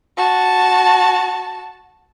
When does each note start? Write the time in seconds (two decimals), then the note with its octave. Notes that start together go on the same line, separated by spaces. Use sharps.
0.17 F#4 A5